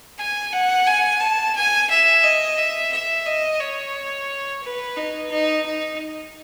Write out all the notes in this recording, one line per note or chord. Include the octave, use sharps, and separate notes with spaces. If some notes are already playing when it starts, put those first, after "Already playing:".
G#5
F#5
G#5
A5
G#5
E5
D#5
E5
E5
D#5
C#5
B4
D#4
D#4
D#4